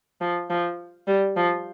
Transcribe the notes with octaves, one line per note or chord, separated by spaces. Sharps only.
F3
F3
G3
F3